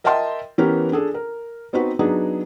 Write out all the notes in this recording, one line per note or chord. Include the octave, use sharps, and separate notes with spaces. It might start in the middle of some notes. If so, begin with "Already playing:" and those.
A#4 D#5 E5 G5 A5 C6
E3 B3 C#4 G4 A#4
D4 G#4 A4
A#4
B3 C4 D#4 F#4 B4
F#3 B3 D4 D#4 G#4